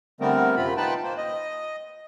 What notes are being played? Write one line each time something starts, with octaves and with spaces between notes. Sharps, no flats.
D3 G3 A3 B3 C4 A#4
F#2 C3 C4 F4 B5
D#4 F4 B4 G5 A5 B5
A#3 C5
D#5